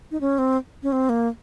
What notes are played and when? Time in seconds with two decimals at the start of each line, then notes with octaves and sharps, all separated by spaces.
0.11 D#4
0.21 C#4
0.38 C4
0.83 C#4
0.92 C4
1.09 A#3